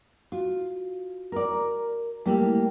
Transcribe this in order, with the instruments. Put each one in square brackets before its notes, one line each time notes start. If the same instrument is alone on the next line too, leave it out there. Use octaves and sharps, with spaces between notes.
[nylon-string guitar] F4 [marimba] F#4
[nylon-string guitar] A#4 D5
[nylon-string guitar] G3 A#3 G4 [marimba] A3 E4